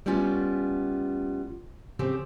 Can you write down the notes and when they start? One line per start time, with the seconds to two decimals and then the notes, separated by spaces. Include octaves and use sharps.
0.06 G3 A3 B3 C#4 F4
1.99 C#3 F3 C4 G4